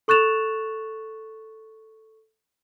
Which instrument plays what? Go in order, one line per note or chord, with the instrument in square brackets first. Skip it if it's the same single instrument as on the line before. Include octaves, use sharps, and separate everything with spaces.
[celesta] A4 C#6 F#6 A6 E7 F7